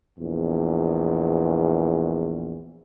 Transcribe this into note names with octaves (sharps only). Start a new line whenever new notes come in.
A#1 E2